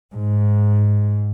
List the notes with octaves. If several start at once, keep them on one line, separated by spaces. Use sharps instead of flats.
G#2